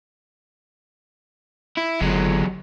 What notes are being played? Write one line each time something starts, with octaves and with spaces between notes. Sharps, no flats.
E4
G1 F#3 G#3